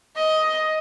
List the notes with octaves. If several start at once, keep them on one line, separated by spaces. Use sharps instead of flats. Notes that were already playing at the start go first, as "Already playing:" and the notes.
D#5